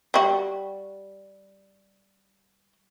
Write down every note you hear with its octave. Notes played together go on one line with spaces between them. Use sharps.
G3 F#4